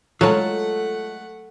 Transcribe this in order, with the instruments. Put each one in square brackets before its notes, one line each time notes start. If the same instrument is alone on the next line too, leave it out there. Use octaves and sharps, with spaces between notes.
[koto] F#3 [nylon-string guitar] G#3 A4 [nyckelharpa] A3 F#5 [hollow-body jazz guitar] F4 A5